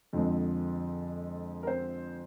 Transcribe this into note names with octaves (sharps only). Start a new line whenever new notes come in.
F2 D3 F3 G#3 C4
A#4
C4 C5